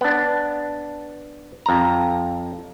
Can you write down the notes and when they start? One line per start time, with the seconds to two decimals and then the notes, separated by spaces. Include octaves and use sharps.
0.01 B3 D4
1.66 F2 A#5